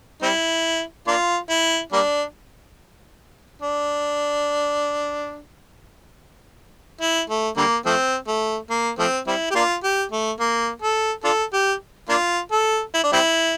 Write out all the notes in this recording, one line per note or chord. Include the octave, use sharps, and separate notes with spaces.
G3 C4 E4
A#3 D4 F4
E4
G3 A#3 D4
D4
E4
A3
D3 G3 A#3
F3 A3 C4
A3
A#3
F3 A3 C4
G3 C4 E4
G4
A#3 D4 F4
G4
A3
A#3
A4
D4 F4 A4
G4
A#3 D4 F4
A4
E4
D4
G3 C4 E4